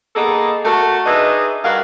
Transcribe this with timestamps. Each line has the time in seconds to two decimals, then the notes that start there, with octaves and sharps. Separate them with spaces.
0.15 A#3 B3 D#4 G#4 A4
0.65 A3 F#4 A#4
1.06 D4 D#4 G#4 B4 D#5 E5
1.64 G2 F#4 A#4 F5